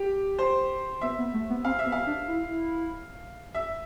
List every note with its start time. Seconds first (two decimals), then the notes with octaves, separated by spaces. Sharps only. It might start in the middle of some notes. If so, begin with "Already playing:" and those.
Already playing: G4
0.39 C5
1.01 B3 E5
1.18 B3
1.34 A3
1.50 B3
1.65 C4 F5
1.79 E5
1.86 B3
1.92 F5
2.07 D4
2.28 E4
3.54 E5